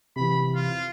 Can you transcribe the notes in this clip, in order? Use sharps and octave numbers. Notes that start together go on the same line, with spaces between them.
C3 E3 B5
F4